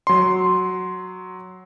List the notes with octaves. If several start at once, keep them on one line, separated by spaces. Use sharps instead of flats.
F#3 C6